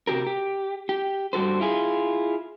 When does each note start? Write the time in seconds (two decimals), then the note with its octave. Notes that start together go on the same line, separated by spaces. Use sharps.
0.07 C3 F#4 G4 A#4
0.27 G4
0.89 G4
1.33 G2 G3 F#4 A4 C5
1.60 E4 F4 G#4